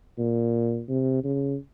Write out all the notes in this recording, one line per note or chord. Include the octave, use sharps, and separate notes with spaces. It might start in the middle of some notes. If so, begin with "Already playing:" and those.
A#2
C3
C#3